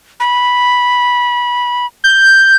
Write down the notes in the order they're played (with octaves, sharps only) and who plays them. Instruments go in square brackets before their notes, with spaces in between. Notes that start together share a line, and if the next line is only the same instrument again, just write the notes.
[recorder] B5
[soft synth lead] G6